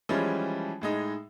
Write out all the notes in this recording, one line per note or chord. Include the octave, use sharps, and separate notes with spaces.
E3 F3 G3 G#3 C#4
A2 G#3 D#4